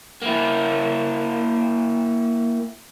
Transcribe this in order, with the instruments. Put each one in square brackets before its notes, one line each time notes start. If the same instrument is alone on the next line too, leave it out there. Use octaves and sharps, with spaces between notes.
[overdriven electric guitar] A#3 E4